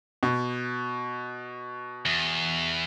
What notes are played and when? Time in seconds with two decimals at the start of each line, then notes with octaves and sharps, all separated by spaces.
0.23 B2
2.06 E2